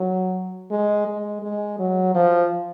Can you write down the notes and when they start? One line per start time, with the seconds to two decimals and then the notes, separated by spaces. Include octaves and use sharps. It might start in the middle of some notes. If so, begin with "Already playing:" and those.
Already playing: F#3
0.71 G#3
1.07 G#3
1.42 G#3
1.79 F#3
2.15 F3